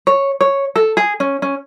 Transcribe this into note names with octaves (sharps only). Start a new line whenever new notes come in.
C#5
C#5
A4
G#4
C#4
C#4